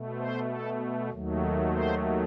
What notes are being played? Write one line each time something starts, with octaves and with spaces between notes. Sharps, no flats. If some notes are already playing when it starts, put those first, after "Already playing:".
Already playing: B2 A3
C5
A4
D#2 D#3 F#3 A3
C5